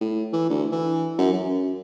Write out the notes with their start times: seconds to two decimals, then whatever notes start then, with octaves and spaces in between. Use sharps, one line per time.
0.01 A2
0.33 E3
0.50 D2
0.72 E3
1.18 F#2
1.33 F#2